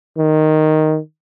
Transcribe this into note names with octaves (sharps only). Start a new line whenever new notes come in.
D#3